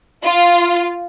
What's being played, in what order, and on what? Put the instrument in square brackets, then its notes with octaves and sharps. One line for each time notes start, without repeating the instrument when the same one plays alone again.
[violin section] F4